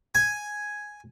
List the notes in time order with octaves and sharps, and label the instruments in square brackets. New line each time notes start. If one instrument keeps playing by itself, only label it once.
[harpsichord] G#5